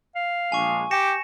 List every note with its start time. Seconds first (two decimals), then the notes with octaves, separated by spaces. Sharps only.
0.16 F5
0.52 A#1 G#3 D4 G#5 C#6
0.91 G4 G5 A#6 C#7 E7